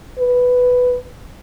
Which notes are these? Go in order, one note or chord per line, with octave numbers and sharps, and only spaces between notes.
B4